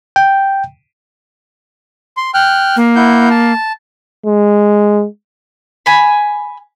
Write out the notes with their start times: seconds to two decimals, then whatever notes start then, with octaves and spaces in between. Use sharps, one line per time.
0.16 G5
2.17 C6
2.34 G5 F6 F#6
2.76 A#3
2.95 E4 F#5 G6
3.30 A5
4.26 G#3
5.86 G#5 B5